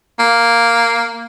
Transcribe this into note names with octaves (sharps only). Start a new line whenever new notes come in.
A#3